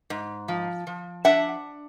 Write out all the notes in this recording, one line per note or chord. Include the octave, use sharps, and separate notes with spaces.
G#2
F3
F3
D4 E5 F#5